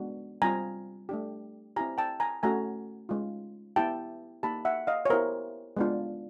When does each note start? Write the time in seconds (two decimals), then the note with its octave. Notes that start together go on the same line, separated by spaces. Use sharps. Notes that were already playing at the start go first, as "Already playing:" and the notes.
Already playing: G#3 B3 D4 F#4
0.42 G3 C4 F4 G#5 A#5
1.09 A3 D4 G4
1.76 C4 E4 G4 G#5 A#5
1.98 G5 A5
2.20 G#5 A#5
2.43 A3 C#4 F#4 G#5 A#5
3.09 G#3 C#4 F4
3.76 B3 E4 G4 G5 A5
4.43 A#3 D#4 G4 A5 B5
4.65 E5 F#5
4.87 D#5 F5
5.05 C#5
5.10 B3 E4 G4 A#4 C5
5.77 G#3 B3 D4 F4